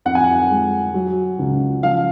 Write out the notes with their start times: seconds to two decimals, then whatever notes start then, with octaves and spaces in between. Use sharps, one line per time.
0.05 F2 F#5
0.15 G#5
0.24 F#5
0.50 G#3
0.94 F#3
1.39 C#2
1.83 F3 F5